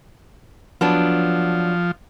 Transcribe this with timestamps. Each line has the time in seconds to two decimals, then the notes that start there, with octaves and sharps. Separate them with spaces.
0.81 F3 F#3 B3 D4